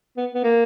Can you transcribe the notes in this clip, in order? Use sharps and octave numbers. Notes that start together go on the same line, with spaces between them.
B3
B3
A#3